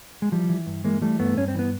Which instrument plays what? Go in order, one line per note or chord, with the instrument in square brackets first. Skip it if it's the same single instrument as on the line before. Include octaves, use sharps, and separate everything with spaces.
[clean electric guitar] G#3
E3 F3 G3
E3
G2
E3 G#3 A#3
E3 G3 A3
G2 A3 B3
G2 C#4
C4
E3 B3